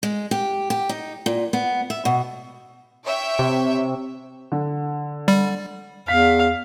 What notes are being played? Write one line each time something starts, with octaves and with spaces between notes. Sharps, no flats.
G#3
G4
G4
D#4
A#2
B3
E5
B2
C#5 E5 G5
C3
D3
G3
E2 F5 B6